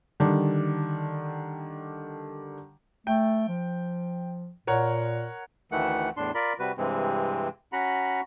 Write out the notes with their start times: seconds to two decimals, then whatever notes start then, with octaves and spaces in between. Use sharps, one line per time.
0.20 D3 D#3 G3 D4
3.07 A3 G5
3.48 F3
4.67 A#2 A#4 C#5 F#5
5.72 D2 D#3 E3 A3 F#5
6.17 E2 A2 D4 C6
6.35 F4 A#4 D5 B5
6.59 C3 G3 F#4 B4
6.78 G2 C3 E3 G#3 C4
7.73 C#4 F#4 F#5 A#5 B5